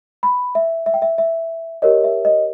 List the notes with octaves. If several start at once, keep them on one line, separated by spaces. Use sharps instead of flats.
B5
E5
E5
G5
E5
E5
G4 A#4 C#5 D#5
E5
D#5